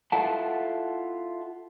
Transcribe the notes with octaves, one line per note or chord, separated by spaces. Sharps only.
E4 F4 A4 F#5 A5